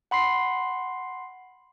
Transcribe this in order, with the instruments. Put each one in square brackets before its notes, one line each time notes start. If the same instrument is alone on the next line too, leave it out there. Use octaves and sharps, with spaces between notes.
[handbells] F#5 B5 C6 C7